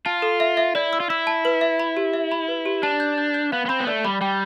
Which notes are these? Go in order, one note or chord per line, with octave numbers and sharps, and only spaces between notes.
F4 A5
A4
E5
E5
E4 D5
E6
F4
E4 E6
A5
B4
E5
B5
G4
E5
B5
B4
G4
D4 A5
G6
G6
G6
B3 F5
B3
C4 B5
B3
A3 D5
G3 B5
G3 G5